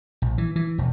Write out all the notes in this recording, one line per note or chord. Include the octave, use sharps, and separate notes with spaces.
A#1
E3
E3
E1